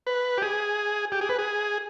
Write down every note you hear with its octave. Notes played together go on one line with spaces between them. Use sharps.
B4
G4
G#4
G4
G#4
B4
G#4